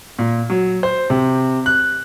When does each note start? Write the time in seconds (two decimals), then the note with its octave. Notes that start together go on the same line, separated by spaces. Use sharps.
0.19 A#2
0.50 F#3
0.83 C5
1.10 C3
1.66 F#6